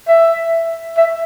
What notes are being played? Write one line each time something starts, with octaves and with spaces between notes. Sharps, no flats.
E5
E5